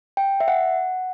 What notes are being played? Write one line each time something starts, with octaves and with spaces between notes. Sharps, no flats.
G5
E5
F#5